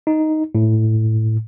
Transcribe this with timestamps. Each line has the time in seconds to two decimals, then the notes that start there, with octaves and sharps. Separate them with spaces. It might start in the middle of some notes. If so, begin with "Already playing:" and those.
0.07 D#4
0.55 A2